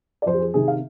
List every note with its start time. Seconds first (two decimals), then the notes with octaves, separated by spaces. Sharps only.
0.22 D5
0.26 F2 C5
0.34 G4
0.40 G#4
0.54 C3 D#3 G#4
0.68 F5